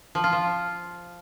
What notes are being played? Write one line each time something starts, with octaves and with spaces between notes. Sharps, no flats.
F3
F4
F3